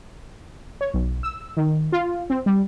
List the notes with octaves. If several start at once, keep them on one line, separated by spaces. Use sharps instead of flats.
C#5
B1
E6
D#3
F4
C4
G3